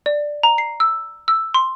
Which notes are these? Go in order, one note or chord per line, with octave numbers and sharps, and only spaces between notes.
D5
A#5
C7
E6
E6
C6